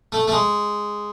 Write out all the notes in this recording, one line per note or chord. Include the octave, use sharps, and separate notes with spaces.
A3
A3
G#3